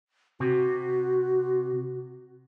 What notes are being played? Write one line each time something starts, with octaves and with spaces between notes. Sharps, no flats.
C3 F#4